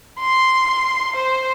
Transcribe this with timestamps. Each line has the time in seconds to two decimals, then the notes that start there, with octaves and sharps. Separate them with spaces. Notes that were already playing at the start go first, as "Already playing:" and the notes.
0.19 C6
1.16 C5